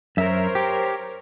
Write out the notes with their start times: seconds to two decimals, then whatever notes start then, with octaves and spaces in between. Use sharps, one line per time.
0.17 F#2 A#4 C5 C#5 E5
0.55 G4